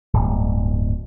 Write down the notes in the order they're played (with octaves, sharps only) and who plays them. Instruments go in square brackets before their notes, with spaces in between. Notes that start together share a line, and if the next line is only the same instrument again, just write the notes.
[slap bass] D1 G1